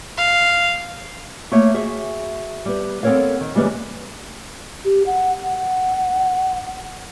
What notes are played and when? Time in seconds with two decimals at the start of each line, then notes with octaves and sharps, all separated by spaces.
0.18 F5
1.52 A3 A#3 C#5 E5
1.74 F#4 G#4 E5
2.65 G3 B3
3.03 B3 C4 A4 A#4 C#5 F5
3.41 D#3
3.55 C#3 E3 G3 G#3 A#3 B3
4.85 G4
5.06 F#5
5.44 F#5